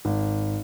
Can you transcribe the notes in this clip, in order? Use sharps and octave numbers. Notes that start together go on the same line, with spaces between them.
G#1